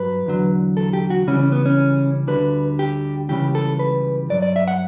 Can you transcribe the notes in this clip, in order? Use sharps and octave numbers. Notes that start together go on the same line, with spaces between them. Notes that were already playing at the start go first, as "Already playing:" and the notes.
Already playing: G2 F#3 B4
E2 D3 F#3
A4
G4
F#4
C#2 C#3 E3 G3 C#4
C#4
B3
C#4
D2 D3 G3 B4
G4
C#2 C#3 E3 G3 G4
A4
B4
G2 F#3 D5
D5
E5
F#5